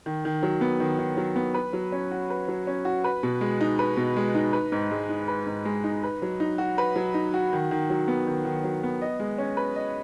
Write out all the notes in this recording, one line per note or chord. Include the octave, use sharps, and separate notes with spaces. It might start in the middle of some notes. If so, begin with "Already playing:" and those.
D#3
D#3
F#3
B3
D#3
D#3
F#3
B3
B4
F#3
C#4
F#4
B4
F#3
C#4
F#4
B4
B2
G#3
D#4
B4
B2
G#3
D#4
B4
G#2
G#3
D#4
B4
G#2
G#3
D#4
B4
F#3
D#4
F#4
B4
F#3
D#4
F#4
D#3
D#3
F#3
B3
D#3
D#3
F#3
B3
D#5
G#3
C#4
B4
D#5